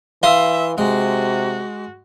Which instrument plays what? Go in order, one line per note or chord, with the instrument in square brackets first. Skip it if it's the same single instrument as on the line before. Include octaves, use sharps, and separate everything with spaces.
[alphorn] E3 [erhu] E5 [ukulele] F5 [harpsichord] C6 D#6
[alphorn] C3 [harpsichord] G#3 [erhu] F#4